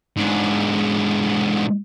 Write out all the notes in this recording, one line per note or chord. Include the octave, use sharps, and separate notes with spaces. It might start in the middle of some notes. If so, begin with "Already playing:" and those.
G#2 D3